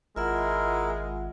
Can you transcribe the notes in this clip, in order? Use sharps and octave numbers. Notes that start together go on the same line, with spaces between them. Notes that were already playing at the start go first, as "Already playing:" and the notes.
G#1 G#3 E4 F4 A#4 E5 F#5